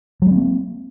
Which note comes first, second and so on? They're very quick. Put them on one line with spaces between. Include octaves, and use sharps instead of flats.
F#3 G#3 C4 A#3